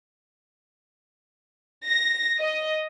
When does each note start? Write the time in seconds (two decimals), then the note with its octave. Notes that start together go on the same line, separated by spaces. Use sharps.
1.85 A#6
2.40 D#5